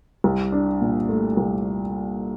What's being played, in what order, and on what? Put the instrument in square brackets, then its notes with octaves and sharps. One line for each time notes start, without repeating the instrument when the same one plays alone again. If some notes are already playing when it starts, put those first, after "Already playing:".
[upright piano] C2
D4
A#2
A3
C2